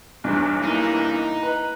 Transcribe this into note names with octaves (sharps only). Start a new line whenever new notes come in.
B1 E2 G2
A#3 D#4 E4
B4 A#5